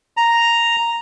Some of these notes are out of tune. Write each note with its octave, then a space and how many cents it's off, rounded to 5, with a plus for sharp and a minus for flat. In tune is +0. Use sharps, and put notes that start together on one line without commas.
A#5 +0